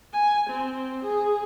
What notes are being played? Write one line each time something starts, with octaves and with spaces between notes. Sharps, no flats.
G#5
C4
G#4